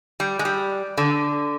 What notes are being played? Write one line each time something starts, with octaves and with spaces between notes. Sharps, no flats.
G3
G#3
G3
D3